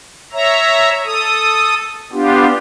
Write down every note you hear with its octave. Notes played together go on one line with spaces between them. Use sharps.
C#5 E5 A#5
A4 D#6
B3 D4 F4 G4